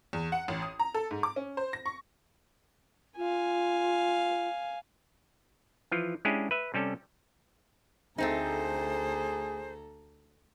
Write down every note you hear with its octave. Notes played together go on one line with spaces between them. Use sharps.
E2
F#5
A1
D#6
A#5
A4
G#2
D6
C#4
C5
A#6
C#6
F4 F5 G#5
E3 F3 F4
G#3 C#4 D4 E4 G4 G#4
B4 E5
C3 G3 C#4 A4
D2 A3 C4 D#4 G#4 A4 C5 A#5